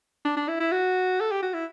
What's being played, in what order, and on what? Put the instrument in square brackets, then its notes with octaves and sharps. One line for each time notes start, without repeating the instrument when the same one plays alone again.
[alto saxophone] D4
D4
E4
E4
F#4
A4
G4
F#4
E4